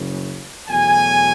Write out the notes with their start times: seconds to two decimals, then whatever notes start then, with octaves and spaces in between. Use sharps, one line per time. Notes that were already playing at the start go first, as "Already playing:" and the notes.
Already playing: F#1 F#2 C#3
0.69 E2 B2 F#3 A3 G#5